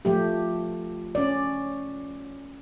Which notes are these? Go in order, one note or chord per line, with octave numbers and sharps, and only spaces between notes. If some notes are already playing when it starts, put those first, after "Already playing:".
F3 A3 G4
C#4 D5